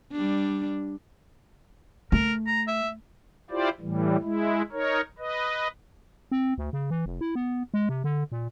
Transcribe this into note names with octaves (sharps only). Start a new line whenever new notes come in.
G3 D4
A3 A#4
A#5
E5
E4 F4 G4 C5 D5
A2 E3 G3
G#3 E4
D#4 A#4 C#5
B4 D#5
C4
D2
C#3
E3
F1
E4
B3
G#3
C3
D3
A#2